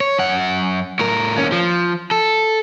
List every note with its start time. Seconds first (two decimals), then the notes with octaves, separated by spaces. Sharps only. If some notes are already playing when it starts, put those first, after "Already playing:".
0.01 C#5
0.19 F#2 F#5
1.00 A2 A#4
1.36 D#2 C#4
1.52 F3
2.11 A4